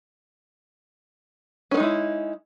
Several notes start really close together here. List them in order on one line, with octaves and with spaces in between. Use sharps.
C#4 B3 D#4 G#3 E4